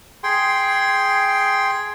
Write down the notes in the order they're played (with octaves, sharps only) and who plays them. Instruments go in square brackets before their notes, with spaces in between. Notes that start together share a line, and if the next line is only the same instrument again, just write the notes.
[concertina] G#4 G5 C6